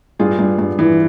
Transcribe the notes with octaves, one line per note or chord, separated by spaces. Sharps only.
G2 F4 G#4
G2
G2
E3